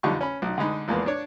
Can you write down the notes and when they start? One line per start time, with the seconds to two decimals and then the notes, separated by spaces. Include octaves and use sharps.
0.03 B1 F2 D3 G3 D#4 C#6
0.21 C#4 B5
0.42 B1 D#4
0.58 D3 G#3 D#4 B5
0.88 A#1 E2 G#3 A#3 B3
1.06 D4 C#5